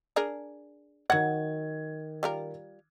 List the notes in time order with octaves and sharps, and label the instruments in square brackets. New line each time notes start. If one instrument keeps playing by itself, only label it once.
[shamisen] D4 G#4 A#4
[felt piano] D#3 G#6 [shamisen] F#3 F#5
[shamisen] G3 F4 A#4